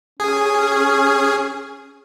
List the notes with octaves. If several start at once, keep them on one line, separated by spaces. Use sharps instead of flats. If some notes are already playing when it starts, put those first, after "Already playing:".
C#4 G#4